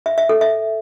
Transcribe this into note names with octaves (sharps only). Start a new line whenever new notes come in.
E5
E5
A4
E5